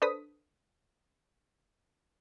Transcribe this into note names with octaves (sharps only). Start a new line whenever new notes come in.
D4 A4 B4 C5 D#6 B6